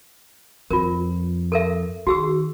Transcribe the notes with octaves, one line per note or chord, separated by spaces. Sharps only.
F2 F4 A#4
A4 A#4 E5
D#3 F#4 G#4 E6